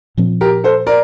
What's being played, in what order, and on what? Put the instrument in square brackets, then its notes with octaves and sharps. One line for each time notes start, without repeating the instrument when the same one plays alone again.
[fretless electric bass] A#2 F3 C4
[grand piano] G4 A#4
A4 C5
A#4 D5